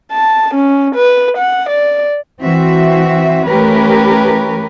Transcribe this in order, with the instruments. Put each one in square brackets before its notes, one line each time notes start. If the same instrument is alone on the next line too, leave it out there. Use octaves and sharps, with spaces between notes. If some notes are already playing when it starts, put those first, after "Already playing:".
[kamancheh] A5
C#4
B4
F#5
D5
[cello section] E3 C4 F#4 E5
E3 A3 C#4 G4 A#4 B4